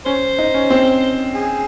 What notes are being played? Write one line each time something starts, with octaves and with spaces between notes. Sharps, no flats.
C#4 C5
D#4
C#4
C4
G#4